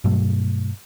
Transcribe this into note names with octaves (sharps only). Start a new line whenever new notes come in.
G2 B2 F#3 A3